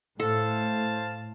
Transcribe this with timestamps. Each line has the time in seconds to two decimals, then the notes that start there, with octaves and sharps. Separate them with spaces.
0.20 A2 A4 C5 F5 A5